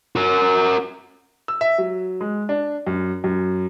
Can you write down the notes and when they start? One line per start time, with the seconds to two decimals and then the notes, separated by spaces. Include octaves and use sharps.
0.16 F#4 A#4
1.48 E6
1.61 E5
1.78 F#3
2.21 G#3
2.49 D4
2.87 F#2
3.24 F#2